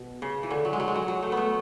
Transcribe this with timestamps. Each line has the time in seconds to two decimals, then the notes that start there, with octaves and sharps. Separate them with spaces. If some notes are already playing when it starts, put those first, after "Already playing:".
Already playing: B2
0.22 C#3
0.43 E3
0.51 D3
0.65 F#3
0.73 G#3
0.80 F#3
0.88 G#3
0.95 F#3
1.08 F#3
1.23 A3
1.32 B3
1.37 A3